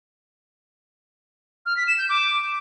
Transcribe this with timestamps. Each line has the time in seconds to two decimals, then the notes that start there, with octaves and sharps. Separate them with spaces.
1.66 F6
1.77 B6
1.87 E7
1.98 G6
2.09 D6